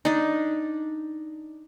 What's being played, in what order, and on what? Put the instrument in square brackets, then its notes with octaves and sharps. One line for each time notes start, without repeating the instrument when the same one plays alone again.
[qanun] D4 D#4